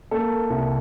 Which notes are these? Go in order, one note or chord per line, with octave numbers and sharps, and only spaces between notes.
A#3 A4
C2